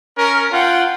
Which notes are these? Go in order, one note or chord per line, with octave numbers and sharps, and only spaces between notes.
C#4 A#4
F4 F#5 G5